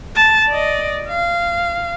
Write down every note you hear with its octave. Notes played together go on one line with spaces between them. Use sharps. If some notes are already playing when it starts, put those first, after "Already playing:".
A5
D5 D#5
F5